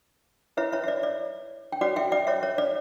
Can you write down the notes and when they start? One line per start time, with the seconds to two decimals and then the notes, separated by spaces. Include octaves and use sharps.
0.57 E4 B4 C#5 E5
0.72 C#5 E5
0.84 E5
0.88 D5
1.03 D5
1.72 G5
1.81 F#4 C#5 D5 F#5
1.96 E5 G5
2.12 D5 F#5
2.27 C#5 E5
2.43 C#5
2.58 D5